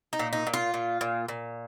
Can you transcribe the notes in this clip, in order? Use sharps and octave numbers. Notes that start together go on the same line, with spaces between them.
D#4
A#2
D#4
A#2
F4
A#2
A#2
A#2